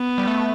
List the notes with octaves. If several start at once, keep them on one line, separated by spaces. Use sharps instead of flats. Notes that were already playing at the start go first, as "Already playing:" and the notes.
Already playing: B3
G3
A3